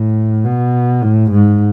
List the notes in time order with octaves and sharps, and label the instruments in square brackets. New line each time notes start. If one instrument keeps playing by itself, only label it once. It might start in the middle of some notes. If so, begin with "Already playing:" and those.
Already playing: [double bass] A2
B2
A2
G#2